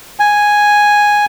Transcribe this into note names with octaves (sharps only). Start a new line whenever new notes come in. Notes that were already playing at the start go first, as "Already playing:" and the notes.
G#5